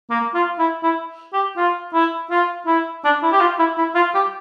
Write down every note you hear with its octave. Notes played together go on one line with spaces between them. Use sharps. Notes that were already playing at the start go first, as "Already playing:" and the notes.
A#3
F4
E4
E4
G4
F4
E4
F4
E4
D4
E4
G4
F4
E4
E4
F4
G4